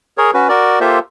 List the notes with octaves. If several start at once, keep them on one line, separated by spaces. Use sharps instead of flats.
G#4 A#4 C#5
C#4 F#4 B4
F#4 A#4 D5
A#3 F4 G4 A4 C5 E5